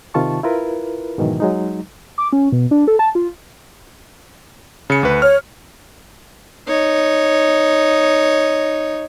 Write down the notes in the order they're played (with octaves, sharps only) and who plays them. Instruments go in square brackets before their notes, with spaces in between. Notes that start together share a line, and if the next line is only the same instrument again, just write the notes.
[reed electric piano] C3 D#3 F4 A5 C#6
E4 F4 A#4 B4
G#2 B2 D#3 E3 F#3
F#3 G#3 D#4
[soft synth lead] D6
C#4
B2
D4
A4
A5
F4
[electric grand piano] C#3 C#7
D2 B4
[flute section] C#5 [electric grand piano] F6
[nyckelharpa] D#4 C#5